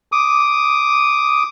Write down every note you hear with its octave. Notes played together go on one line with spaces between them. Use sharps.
D6 D#6